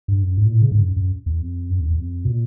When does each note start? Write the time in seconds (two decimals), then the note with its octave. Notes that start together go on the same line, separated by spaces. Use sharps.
0.08 G2
0.23 F#2
0.38 G#2
0.46 A#2
0.52 A2
0.62 C#3
0.72 G#2
0.82 F#2
0.96 F#2
1.26 E2
1.41 F2
1.70 F#2
1.80 E2
1.90 E2
1.99 F2
2.25 B2
2.29 A#2